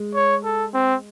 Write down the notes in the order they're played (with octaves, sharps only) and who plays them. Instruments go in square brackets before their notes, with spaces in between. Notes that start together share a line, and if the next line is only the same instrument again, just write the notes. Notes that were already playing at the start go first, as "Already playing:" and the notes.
Already playing: [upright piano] G#3
[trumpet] C#5
A4
C4